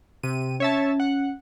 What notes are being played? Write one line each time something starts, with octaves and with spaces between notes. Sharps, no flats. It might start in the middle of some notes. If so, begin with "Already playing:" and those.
C3 D#7
C#4 C#5 E5 A5
F#5